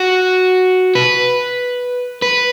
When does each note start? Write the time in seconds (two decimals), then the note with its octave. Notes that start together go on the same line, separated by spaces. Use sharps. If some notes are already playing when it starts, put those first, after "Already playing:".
Already playing: F#4
0.95 B4
2.22 B4